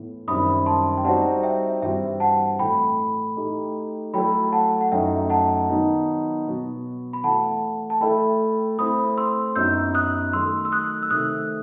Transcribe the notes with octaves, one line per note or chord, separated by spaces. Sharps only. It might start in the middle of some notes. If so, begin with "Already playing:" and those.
Already playing: A2 E3 B3
F#2 D#3 G3 C4 E4 B5 D#6
A5 C6
G5
G3 C4 D#4 F#4 C5 F#5 A5
E5 G5
G2 E3 G3 C4 F#4 E5 G5
F#5 A5
A2 E3 A3 G5 B5
A3 D#4 G4
F#3 A3 E4 A4 G5 B5
F#5 A5
F#5
F#2 F#3 A3 D#4 E5 G5
F#5 A5
D#3 F#3 B3 D#4
B2 F#3 B3 F#4
B5
E3 A3 E4 F#5 A5
A5
A3 E4 A4 E5 G5 B5
A3 C4 E4 B5 D#6
C6 E6
F#2 F#3 B3 D#4 F#4 E6 G6
D#6 F#6
D#3 F#3 A3 D#4 A4 C6 E6
E6
D#6 F#6
E6
C3 D#3 A3 D#6 F#6